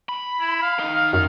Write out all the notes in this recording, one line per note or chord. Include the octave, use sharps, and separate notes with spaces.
B5
E4
F5
D#3 D#4
F5
F#2 F5